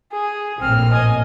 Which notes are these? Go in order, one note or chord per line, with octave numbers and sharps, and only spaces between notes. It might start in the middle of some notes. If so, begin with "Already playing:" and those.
G#4
A#1 A2 A#3 C4 F6
D#5 G#5